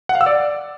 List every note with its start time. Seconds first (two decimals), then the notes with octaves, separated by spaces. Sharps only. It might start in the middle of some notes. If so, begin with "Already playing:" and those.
0.09 F#5
0.15 F5
0.21 E6
0.26 D5